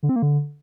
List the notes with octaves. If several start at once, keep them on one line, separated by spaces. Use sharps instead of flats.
D3
C4
A#3
D3